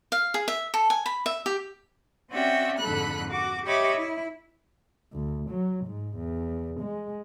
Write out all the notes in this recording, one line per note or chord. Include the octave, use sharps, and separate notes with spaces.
F5
G#4
E5
A4
G#5
B5
E5
G4
C4 C#4 F#4 D5 E5 G5
F2 G#2 D3 A4 B5 F#6
F#4 D6
G4 C#5 D#5 E5 B5 D6
E4
D2
F#3
G#2
E2
G#3